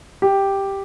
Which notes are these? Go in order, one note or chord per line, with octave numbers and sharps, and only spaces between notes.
G4